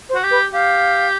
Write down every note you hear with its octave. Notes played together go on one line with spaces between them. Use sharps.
C5
F#4
G4
B4
G4 F5